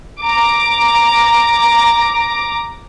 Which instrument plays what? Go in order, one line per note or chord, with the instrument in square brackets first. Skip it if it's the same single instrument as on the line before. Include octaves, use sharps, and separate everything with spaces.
[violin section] A#5 D6